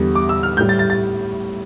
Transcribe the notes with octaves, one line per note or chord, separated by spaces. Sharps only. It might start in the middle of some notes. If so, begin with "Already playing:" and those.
Already playing: E2 D3 G3
D6
E6
F6
A2 G3 G6
A6
A6
A6